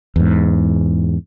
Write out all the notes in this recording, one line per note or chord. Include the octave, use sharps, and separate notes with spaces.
E2 G#2